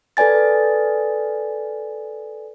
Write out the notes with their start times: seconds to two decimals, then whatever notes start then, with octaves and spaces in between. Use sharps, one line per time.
0.17 A4 B4 D5 G#5 A6